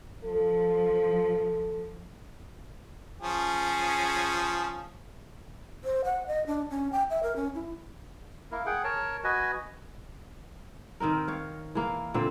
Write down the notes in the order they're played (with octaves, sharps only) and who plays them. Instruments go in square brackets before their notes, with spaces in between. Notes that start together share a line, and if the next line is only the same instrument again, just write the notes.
[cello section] F3 [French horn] A4
[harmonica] F3 C#4 G#4
[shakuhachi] C5
F#5
D#5
D4
C#4
G5
E5
A#4
C#4
E4
[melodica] A#3 E4 A#4
G#4 F#5 G5
A#4 C#5 A5
F#4 B4 D#5 G#5
[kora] D#3 C4 D#4 A#4
C#5 F5
E3 A#3 F5
A#2 D3 C4 F5